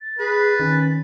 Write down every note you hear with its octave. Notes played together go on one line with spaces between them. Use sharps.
A6
G#4 B4
D#3 C#4